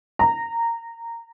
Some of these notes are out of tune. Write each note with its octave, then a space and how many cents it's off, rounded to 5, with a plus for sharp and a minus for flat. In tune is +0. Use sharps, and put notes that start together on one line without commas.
A#5 -15